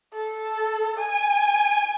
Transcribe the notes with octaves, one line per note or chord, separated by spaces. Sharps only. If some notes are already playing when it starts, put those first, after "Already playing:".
A4
G#5